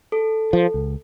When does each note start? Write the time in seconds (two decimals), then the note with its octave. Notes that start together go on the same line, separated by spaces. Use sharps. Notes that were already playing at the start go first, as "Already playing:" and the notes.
0.12 A4
0.53 F3
0.74 C#2